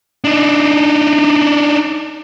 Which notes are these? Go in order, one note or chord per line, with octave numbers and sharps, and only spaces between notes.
D4 D#4